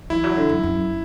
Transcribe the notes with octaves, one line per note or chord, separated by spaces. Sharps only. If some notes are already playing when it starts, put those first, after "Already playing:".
E3 E4
F#3
D3
F#2
F#2